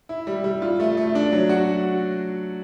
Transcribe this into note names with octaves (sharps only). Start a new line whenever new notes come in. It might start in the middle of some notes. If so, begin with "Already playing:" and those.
E4
G3
G3
F4
A3
A3
D4
F#3
F#4